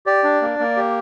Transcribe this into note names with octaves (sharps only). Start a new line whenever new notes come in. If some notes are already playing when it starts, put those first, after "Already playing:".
G4 D5
D4
A#3
A#3
G4